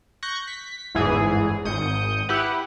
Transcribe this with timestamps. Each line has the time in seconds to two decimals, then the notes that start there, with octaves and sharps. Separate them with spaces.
0.23 C#6 F#6 G6 A#6 C#7
0.47 B6
0.95 G1 E2 G#2 E3 G#4
1.65 G#1 D#6 G6 C#7
2.29 E4 G4 B4 F#5